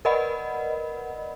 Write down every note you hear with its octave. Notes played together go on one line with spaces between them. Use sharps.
A#4 B4 D5 D#5 F#5 B5